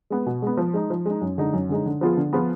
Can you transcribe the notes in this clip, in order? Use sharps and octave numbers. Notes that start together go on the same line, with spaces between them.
G#3 B3
B2
G#3 B3
F3
G#3 D#4
F3
G#3 D#4
F#2
D3 G#3 D#4
F#2
D3 G#3 D#4
D3
F3 B3 F4 G#4
D3
F3 B3 F4 G#4